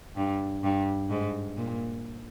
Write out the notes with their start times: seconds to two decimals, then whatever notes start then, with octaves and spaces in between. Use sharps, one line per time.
0.17 G2
0.63 G2
1.10 G#2
1.57 A#2